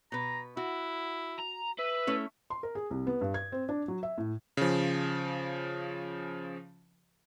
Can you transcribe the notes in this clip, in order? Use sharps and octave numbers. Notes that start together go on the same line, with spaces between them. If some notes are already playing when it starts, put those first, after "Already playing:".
B2 B4 A#5
E4 F#4
A#5
B4 E5
A3 C#4 E4
C6
A#4
G#4
C2
B3
G2
G#6
C4
D4
F#3
E5
A2
C#3 F3